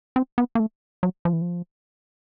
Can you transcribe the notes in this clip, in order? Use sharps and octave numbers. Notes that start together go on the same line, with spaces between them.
C4
B3
A#3
A3
F#3
F3
E3
F3